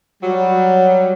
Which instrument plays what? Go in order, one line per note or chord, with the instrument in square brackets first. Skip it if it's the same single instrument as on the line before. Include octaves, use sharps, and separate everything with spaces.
[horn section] F#3 G3